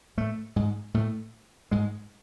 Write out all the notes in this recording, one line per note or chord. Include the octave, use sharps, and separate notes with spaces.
A2 A3
G#2 G#3
A2 A3
G#2 G#3